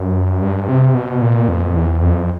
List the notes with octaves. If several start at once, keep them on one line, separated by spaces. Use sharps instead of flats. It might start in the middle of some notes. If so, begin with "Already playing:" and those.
Already playing: F#2
G2
C3
B2
A#2
F2
E2
F2